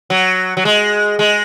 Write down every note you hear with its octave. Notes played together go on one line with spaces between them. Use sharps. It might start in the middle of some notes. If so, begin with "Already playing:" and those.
F#3
F#3
G#3
G#3